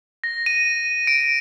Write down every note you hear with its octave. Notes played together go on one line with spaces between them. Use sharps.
A#6
D#7
D7